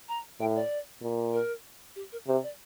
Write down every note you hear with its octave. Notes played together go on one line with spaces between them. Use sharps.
A#5
A2 G5
D5
A#2
A#4
G4
A#4
C3 C5
D5